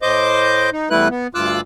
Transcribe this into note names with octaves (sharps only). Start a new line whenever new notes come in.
A2 C5 D#5 D6 G6
D#4
E2 G3 A3 E4 B4 F#6
B3
D2 G2 F4 D6 E6 F#6